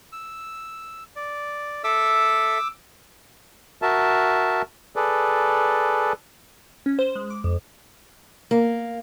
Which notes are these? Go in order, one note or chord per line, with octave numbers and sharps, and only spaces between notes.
E6
D5
A4 E5 D6 E6
F#4 A#4 E5 A5
G#4 A4 B4 D5
C#4
C5
G#3
D6
F2
A#3